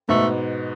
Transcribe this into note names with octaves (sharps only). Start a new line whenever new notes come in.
G#2 B2 A3